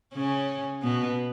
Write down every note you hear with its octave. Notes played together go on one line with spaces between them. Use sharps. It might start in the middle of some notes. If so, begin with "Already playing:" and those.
C#3 C#4
B2 B3